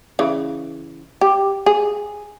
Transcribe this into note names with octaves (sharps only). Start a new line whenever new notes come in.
C#3 E3
G4
G#4